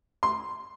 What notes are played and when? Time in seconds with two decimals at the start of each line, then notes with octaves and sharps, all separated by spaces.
0.23 C6